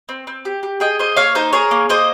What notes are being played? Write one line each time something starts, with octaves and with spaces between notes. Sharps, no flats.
C4
C4
G4
G4
G#4 D#5 G5
A#3 C5 D#5
A#3 C#5 F5
D#4 C5
G#4 A#4 C#5
A#3
A#3 C5 D#5